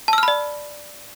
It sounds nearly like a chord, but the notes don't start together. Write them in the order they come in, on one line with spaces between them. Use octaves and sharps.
A5 E6 F6 B5 D5